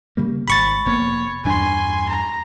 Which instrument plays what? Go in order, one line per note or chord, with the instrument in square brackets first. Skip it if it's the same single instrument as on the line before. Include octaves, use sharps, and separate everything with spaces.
[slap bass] C#3 G3 A#3
[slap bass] G#1 G#2 [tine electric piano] B5 C#6 A6
[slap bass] F1 A#3 B3 [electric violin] C#5
[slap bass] E2 G2 D4 [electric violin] G#5 C6
[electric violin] A#5